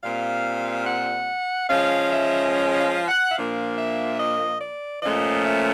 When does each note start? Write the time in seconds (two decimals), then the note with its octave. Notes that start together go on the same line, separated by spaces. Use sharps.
0.02 A#2 G3 C4 F5
0.87 F#5
1.69 F3 G#3 C#4 F5
2.11 E5
2.81 F5
3.08 F#5
3.32 E5
3.36 A#2 F3 A#3 D4 F5
3.77 E5
4.20 D#5
4.61 D5
5.03 A#2 F3 A3 C#4 D#5
5.45 E5